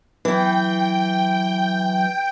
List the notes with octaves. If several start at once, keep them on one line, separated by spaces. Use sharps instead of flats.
E3 F#3 G5